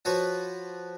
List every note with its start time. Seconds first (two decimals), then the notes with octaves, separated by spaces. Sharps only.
0.05 F3 F#4 B4 C#5